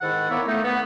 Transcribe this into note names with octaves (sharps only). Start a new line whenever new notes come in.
G#2 D#3 E4 A4 F#5
A#3 B3 E4 C#5 D5 E5
A3 D#4
B3